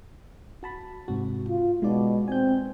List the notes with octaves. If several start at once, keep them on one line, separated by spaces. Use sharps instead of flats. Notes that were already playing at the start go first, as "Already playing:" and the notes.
F#4 A5 B5
G#2 C3 F#4
F4
B2 G#3 D#4 D5
C4 G#5 G6